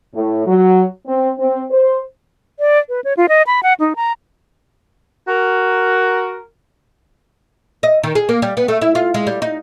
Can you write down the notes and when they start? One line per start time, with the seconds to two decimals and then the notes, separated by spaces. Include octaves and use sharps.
0.15 A2
0.46 F#3
1.06 C4
1.38 C4
1.71 C5
2.59 D5
2.89 B4
3.04 C#5
3.17 F4
3.29 D#5
3.47 B5
3.63 F#5
3.80 D#4
3.96 A#5
5.27 F#4 A#4
7.83 D#5
8.03 D#3
8.15 G#4
8.29 A#3
8.42 G3
8.57 B3
8.68 A3
8.82 E4
8.95 F4
9.14 G#3
9.27 G3
9.42 D#4